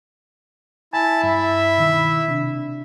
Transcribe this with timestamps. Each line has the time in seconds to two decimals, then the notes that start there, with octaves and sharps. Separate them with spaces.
0.93 E4 G#5 A5 B5
1.23 G2 E5
1.78 B2 D#3
2.28 C3 D4